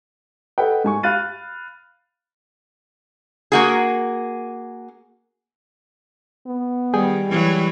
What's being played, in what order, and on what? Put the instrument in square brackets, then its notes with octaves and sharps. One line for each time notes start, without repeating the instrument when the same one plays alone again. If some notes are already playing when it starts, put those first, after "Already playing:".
[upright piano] A4 B4 D#5 F#5 G5
G#2 G#5 C#6
F5 B5 F6 F#6 A6 D#7
[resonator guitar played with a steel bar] A#3 F#4 G#4
[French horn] B3
[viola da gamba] D#3 [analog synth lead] G3 [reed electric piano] G#4 G5 G#5
[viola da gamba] E3 F#3